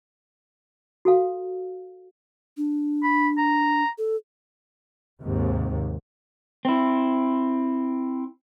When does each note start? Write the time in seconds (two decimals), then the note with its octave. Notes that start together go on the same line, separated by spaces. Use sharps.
1.05 F#4 A4 F5
2.57 D4
3.03 B5
3.38 A#5
3.98 A4
5.23 D#2 G#2 C3
6.65 C4 E4